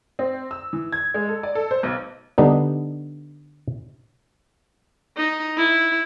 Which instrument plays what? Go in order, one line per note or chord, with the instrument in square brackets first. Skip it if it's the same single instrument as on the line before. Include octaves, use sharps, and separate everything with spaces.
[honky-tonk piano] C4
E6
E3
G#6
G#3
A4
D5
A4
C5
B1
[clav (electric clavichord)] D3 G3 B3 D4 D#4
[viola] D#4
E4